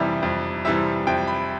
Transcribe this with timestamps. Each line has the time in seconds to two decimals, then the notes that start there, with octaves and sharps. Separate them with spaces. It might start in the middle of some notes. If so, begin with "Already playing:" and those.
Already playing: F2 C3 E3 G3 D5
0.23 F2
0.65 C3 E3 G3 E5
1.07 F2 G5
1.27 B5